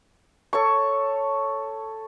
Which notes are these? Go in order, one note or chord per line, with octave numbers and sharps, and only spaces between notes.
A4 C#5 C#6